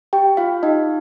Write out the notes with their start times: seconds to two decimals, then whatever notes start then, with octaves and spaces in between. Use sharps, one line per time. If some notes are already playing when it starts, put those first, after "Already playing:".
0.13 G4 G5
0.37 F4 F5
0.63 D#4 D#5